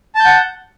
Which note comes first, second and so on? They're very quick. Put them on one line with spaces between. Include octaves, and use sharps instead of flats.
A5 G6 F#5